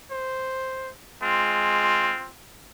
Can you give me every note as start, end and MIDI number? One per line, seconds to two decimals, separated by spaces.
0.11 0.91 72
1.22 2.13 56
1.22 2.29 60
1.22 2.27 65